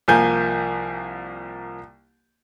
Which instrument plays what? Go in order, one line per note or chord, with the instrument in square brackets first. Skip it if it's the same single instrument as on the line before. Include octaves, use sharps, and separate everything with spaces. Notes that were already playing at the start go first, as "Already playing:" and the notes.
[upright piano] C2 F3 A#3 G#5 G6